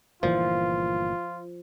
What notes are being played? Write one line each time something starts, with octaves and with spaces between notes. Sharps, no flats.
G1 A#2 E3 F3 F4